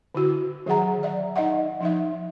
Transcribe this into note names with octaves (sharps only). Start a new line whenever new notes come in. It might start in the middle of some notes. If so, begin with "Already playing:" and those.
D3 E4 F#4
D#3 F#3 G#4 F#5 A#5
D5 E5
D#4 D#5 E5 F#5
F3 D#4 E5